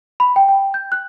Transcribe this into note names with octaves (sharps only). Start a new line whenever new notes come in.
B5
G5
G5
G6
F#6